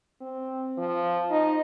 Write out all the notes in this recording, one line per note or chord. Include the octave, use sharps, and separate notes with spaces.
C4
F3
D#4